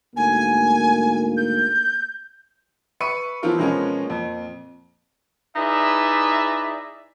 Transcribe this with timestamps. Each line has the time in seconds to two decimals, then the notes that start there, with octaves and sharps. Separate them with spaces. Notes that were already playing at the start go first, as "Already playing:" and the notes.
0.16 D2 G#2 A#3 G#5
1.37 G6
3.00 B4 E5 C#6 C#7 D#7
3.43 E3 F3 B3 C4 F4 A#4
3.58 B2 F3 G#3 B3 C#4 A#4
4.05 F2 A#2
5.56 D#4 E4 G#4 B4 D5 E5